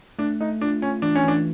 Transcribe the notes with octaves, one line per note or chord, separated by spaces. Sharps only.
A3 D4
A3 D#4
D4 F4
C#4 F4
E3 D4
C#4
E3 D4